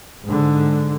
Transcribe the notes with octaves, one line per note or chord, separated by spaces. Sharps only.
G#2 D3